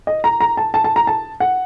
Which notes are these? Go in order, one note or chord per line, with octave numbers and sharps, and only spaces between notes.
D#5
A#5
A#5
A5
A5
A5
A#5
A5
F#5